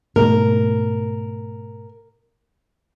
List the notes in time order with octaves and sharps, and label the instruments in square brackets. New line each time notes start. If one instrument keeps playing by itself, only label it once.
[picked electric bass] G#2 B2 A3 [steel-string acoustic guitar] A#4